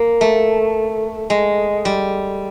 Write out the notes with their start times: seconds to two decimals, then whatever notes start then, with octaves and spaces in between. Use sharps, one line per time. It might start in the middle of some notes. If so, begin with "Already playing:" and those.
Already playing: A#3
0.21 A3
1.30 G#3
1.85 G3